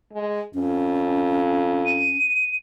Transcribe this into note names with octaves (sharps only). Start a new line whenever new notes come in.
G#3
F2 C#4
D#7